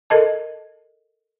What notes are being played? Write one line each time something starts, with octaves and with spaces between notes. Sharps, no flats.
A4 A#4 D#5 A5